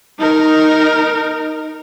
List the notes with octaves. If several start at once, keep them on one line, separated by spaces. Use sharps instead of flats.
D#4 A#4